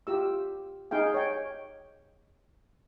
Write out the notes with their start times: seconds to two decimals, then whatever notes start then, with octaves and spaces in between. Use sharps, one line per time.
0.07 F4 G4 E6
0.91 D#4 G#4 F5 G5
1.14 C#5 G5